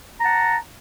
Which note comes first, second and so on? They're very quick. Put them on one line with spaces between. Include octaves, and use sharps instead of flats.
A#5 A5 F#5